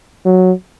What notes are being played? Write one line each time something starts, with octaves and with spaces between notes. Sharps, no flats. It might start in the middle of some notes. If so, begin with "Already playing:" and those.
F#3